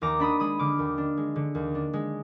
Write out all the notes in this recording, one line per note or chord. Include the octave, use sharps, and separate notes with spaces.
D#2 A#5 D6
D4 B5 D#6
G#3 B5 D#6
D3 D6 F6
D#2
D4
G#3
D3
D#2
D4
G#3